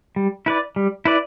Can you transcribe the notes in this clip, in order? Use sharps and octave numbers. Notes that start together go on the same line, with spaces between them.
G3
E4 B4 D5
G3
E4 B4 D5